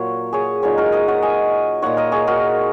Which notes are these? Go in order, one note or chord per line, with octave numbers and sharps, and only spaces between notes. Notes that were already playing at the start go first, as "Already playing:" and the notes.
Already playing: A#2 F#3 A#3 C#5 F#5
G#4 C#5
A#2 F#3 D#4 G#4 C#5
F#4 A#4
A#4 D#5
C#5 F#5
D#5 G#5
A#2 A#3 D#4 C#5 F#5
A#4 D#5
G#4 C#5
F#4 A#4